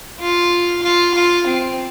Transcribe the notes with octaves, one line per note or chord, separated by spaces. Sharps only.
F4
F4
F4
C4